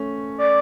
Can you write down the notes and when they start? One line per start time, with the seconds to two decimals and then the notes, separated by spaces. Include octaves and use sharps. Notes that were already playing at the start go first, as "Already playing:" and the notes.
Already playing: A3 C#4
0.38 D5